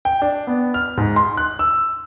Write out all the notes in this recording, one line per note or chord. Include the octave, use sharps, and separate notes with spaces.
G5
D4
B3
F6
G#2
C6
F#6
E6